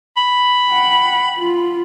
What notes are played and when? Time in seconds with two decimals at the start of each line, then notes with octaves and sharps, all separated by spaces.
0.17 B5
0.69 F#5 G5
1.38 F4